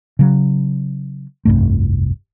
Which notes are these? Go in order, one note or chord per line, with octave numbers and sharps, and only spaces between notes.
C#3 F#3
F1 C2 G2 A3